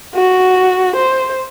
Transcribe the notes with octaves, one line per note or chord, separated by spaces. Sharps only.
F#4
C5